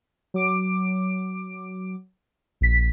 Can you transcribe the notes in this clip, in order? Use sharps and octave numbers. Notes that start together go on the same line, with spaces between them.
F#3 D6 D7
A#1 B6